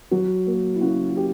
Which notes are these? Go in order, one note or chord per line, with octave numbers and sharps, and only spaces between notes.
F#3 F#4
A#3
E4
C#3 F#4
F#4
G4